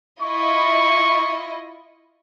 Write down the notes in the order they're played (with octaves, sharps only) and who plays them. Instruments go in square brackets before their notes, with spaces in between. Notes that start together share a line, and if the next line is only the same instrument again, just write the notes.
[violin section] E4 F4 D#5 [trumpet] C#6